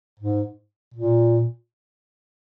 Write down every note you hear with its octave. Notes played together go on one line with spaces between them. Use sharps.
G#2
A#2